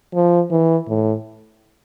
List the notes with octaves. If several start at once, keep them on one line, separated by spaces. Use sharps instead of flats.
F3
E3
A2